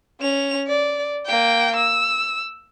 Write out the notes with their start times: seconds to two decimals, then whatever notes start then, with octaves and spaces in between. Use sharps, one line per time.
0.21 C#4 F7
0.68 D5
1.26 A#3 G5
1.76 E6